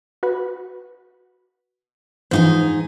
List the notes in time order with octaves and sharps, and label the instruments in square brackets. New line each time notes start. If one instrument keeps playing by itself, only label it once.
[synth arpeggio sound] F#4 B4
[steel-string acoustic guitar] G#2 D#4 G#5 [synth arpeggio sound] E3 F3 C5